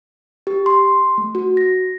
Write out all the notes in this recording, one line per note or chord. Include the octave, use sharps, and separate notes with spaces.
G4
C6
A3
F#4
A#6